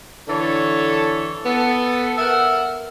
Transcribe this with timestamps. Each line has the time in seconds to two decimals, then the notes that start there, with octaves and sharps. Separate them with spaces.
0.28 D3 E3 A4 C#5
1.45 B3 A4
2.18 A#4 E5 F#5